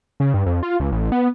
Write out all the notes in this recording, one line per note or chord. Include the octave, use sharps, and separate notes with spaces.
C#3
G2
F2
F4
C#2
A1
B3